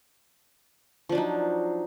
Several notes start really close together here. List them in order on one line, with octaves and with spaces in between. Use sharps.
F3 D4 F#3 D#4